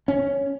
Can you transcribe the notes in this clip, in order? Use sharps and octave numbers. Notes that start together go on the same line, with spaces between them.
C#4